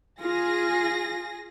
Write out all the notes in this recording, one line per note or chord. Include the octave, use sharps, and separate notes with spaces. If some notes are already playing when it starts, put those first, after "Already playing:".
F4 G#4 A#6